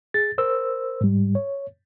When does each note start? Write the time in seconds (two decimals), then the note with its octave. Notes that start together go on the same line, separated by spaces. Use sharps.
0.14 G#4 A6
0.38 A#4 C5 E6
1.01 G#2 G3
1.35 C#5